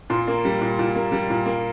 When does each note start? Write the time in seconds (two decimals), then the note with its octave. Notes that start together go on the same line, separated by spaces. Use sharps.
0.10 A#2 C6
0.28 A#3
0.45 G3
0.61 A#2
0.79 A#2
0.95 A#3
1.12 G3
1.30 A#2
1.46 A#3